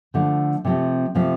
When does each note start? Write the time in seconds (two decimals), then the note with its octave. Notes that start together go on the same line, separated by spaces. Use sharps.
0.14 D3 F3 A3
0.65 C3 F3 A3 C4
1.15 C3 F3 A3 C4